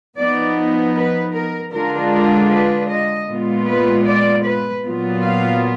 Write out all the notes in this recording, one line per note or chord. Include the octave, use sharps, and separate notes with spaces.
F3 B3 D#4 D5
B4
A#4
D3 G#3 D4 F4 A#4
A#4
B4
D#5
A#2 G#3 B3 F4
B4
D5
B4
A#2 F#3 B3 F4
F5